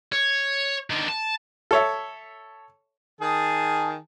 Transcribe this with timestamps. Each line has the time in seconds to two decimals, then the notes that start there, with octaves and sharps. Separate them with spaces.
0.12 C#5
0.90 D3 D#3
1.09 A5
1.71 A4 C#5 E5
3.21 D#3 G#4 A5